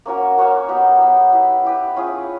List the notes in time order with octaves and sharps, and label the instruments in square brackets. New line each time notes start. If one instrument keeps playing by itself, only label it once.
[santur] A#3 C#4 F#4 A#4
A#3 C#4 F#4 A#4
F#3 B3 D#4 G4
F#3 B3 D#4 G4
E4 G4 B4
E4 G4 B4
C#4 F4 G#4